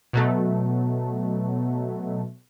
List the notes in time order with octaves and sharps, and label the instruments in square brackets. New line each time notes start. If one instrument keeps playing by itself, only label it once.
[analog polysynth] B2 F#3 A3